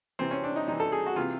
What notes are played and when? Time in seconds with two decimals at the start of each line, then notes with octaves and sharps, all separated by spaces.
0.19 C3 E3 C4
0.31 C#4
0.44 D4
0.56 D#4
0.68 C3 E3 D#4
0.80 A4
0.92 G#4
1.06 F#4
1.16 C3 E3 F4